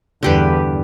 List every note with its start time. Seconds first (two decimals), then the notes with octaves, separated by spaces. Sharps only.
0.23 E2 G2 D3 G4 B4